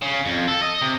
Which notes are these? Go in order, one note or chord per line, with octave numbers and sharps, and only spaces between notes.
C#3
F2
A4
D#5
C3